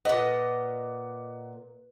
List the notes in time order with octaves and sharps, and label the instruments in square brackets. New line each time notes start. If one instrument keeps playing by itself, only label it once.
[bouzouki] A#2 D#5 [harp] B4 [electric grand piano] F#5